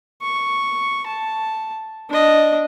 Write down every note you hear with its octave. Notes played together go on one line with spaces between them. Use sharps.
C#6
A5
D4 D#5